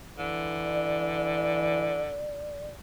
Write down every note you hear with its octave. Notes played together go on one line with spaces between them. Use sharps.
D3 E3
D5